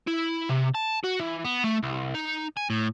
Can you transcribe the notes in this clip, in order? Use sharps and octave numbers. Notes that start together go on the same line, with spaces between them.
E4
C3
A5
F#4
E3
B3
A3
C2
D#4
G#5
A2